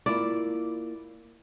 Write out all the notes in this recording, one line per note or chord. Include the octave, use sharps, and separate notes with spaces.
A#3 E4 F4 D5